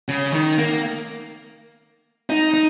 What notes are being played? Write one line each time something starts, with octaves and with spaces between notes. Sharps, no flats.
C#3
D#3
A#3
D#4
D#4